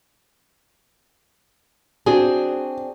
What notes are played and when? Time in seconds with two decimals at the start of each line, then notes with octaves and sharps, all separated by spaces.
2.06 C4 D4 F#4 G#4